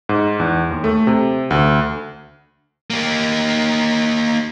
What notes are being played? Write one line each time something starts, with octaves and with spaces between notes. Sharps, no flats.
G#2
E2
D#2
A3
C3
D2
A#3 G4